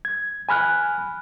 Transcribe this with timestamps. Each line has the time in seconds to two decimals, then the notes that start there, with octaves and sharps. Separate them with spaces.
0.05 G#6
0.49 G#5 B5 F6 F#6